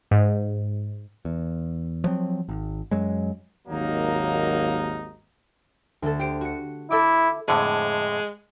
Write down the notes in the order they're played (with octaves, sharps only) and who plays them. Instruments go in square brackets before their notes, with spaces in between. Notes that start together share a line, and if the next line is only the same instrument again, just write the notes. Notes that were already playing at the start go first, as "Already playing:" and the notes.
[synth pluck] G#2
[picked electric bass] E2
F3 F#3 C4
G#1
F#2 F#3 G#3
[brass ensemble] G#1 D#2 F#3 A#3 D#4
[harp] D2 A4
G4 C5 D7
F#4 C#7
[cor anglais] E4 [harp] A4 E5 D6
[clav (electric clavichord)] F2 A2 D3 [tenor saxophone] G#3